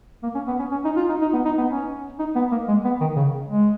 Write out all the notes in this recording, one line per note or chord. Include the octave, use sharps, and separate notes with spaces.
A#3
C#4
B3
C#4
C#4
D#4
F4
D#4
D#4
B3
D#4
B3
C#4
D#4
B3
A#3
G#3
B3
D#3
C#3
G#3